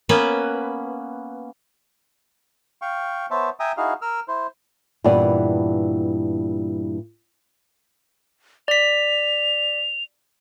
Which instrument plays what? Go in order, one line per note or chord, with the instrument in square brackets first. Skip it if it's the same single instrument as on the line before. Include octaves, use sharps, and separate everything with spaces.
[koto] A#3 B3 C#4 B4
[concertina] F5 G5 C#6
B3 C5 C#5 E5 A5
E5 G5 G#5 A#5 D#6
D#4 E4 F#4 G#4 F5
A#4 E6 F6
E4 C5
[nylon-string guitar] G2 A#2 E3 B3 D5
[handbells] D5 B6 [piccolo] F7